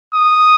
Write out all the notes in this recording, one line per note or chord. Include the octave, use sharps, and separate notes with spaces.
D#6